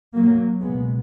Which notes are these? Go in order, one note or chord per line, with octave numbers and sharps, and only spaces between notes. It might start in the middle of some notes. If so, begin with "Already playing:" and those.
F#3 A#3
C#2 B2 G#3 B3